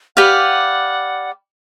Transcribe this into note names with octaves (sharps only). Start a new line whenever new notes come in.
G4 B4 D5 F5 F#5